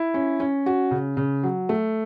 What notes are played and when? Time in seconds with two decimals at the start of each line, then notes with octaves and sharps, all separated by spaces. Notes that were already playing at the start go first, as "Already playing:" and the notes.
Already playing: E4
0.14 C#4
0.40 C#4
0.66 F#4
0.91 C#3
1.17 C#3
1.43 F#3
1.69 A3